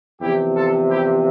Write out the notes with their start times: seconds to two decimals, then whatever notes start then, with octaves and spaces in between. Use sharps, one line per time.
0.20 E2 C3 F3 E4 G4
0.54 F4 A4
0.89 E4 G4